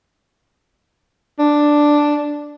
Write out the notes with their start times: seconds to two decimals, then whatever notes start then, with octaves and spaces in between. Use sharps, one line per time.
1.39 D4